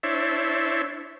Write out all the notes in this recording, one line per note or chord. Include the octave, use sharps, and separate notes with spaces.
D4 E4 C5 C#5 E5 A5